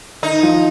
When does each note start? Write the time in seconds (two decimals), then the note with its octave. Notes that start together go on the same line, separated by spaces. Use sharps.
0.22 D#3 D#4
0.43 F3